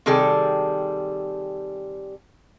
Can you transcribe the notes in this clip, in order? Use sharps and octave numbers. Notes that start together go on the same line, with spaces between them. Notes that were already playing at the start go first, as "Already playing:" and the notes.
C3 D#3 G3 G#4 A4